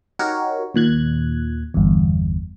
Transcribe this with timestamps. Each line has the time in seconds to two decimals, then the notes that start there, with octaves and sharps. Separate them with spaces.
0.19 D#4 F#4 G4 A#4 C#5
0.75 D#2 A#2 F#6 G#6
1.74 G1 E2